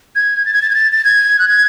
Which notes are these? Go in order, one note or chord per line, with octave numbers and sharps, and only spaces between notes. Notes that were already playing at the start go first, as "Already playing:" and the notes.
G#6
A6
G#6
A6
G#6
A6
A6
G#6
F#6
G#6